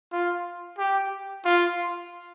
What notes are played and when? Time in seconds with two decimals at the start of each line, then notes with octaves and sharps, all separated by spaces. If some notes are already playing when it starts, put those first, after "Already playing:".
0.12 F4
0.79 G4
1.45 F4